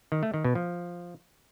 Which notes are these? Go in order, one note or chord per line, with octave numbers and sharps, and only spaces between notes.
D#3
A3
D#3
B2
F3